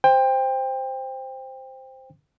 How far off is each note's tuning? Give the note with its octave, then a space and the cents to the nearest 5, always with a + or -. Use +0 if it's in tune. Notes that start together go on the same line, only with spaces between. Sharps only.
C5 +0 G5 +20